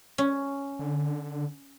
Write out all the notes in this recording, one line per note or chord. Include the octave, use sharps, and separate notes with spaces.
C#4
D3